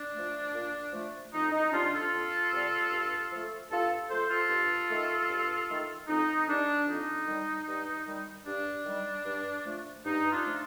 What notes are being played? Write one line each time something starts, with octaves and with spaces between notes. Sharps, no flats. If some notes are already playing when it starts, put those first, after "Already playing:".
Already playing: D4
F3 A3
A#2
F3 A3
F2 D#4
D#4
C3 G3 D4 F4
F4 A4
F2
C3 G3
G2
F3 A3
G2 F4 A4
F3 A3 A4 C5
F4 A4
G2
D#3 A3
G2
D#3 A3
F2 D#4
D#3 G3 D4
F2 D#4
D#3 G3
G2
D#3 G3
G2 D4
D#3 G3
G2
F3 A3
G2 D#4
D4 F4
F3 A3